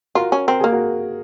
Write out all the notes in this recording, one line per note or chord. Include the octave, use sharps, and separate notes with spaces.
F4 F#4 A#4
C#4
C4 A#4
A#3 G#4
F#4 A#4